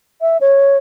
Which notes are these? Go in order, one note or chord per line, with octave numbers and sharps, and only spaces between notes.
E5
C#5